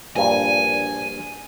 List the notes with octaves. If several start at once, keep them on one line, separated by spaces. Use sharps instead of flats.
A#1 G2 A#2 G#5